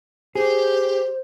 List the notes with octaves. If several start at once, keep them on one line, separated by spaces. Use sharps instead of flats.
G4 G#4 C5